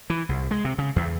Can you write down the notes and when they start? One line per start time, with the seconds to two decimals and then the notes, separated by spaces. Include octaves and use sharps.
0.10 E3
0.29 C2
0.51 G#3
0.65 C3
0.78 C#3
0.96 E2